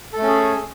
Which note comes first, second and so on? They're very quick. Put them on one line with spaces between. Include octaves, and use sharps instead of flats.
A4 A3 C#4 G#4